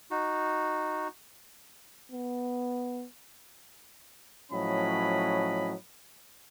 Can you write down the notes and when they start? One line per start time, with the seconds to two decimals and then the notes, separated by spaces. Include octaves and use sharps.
0.11 D#4 F#4
2.12 B3
4.52 A2 F3 F#3 C#4 D#5 B5